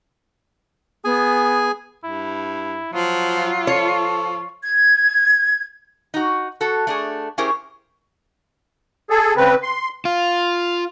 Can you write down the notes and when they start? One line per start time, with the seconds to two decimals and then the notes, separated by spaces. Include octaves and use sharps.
1.05 B3 G#4 G#5
2.04 G2 E4
2.93 F3 F#3 F4
3.67 F3 A4 C#5
4.63 G#6
6.14 D#4 F#4
6.61 F#4 A4
6.87 A3 D4 G#4
7.38 C#4 E4 G4 G#4 A#4 C5
9.10 G#4 A4
9.37 C#3 C4 B4
9.63 C6
10.05 F4